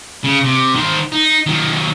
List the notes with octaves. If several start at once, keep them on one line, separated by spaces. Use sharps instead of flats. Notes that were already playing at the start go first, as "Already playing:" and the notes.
C#3
C3
D#3 C5
D#4
D#3 F#3